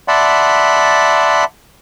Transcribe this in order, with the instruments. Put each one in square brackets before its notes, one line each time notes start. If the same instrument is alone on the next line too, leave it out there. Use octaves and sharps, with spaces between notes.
[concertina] D5 E5 F#5 A5 B5 C6